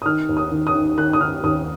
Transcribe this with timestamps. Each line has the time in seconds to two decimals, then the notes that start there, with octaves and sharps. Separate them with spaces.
0.02 D#6
0.06 D#3 F6
0.29 D#2
0.37 D#6
0.51 D#3
0.67 D#6
0.75 D#3
0.98 D#3 F#6
1.13 D#6
1.21 D#3 F6
1.43 D#2 D#6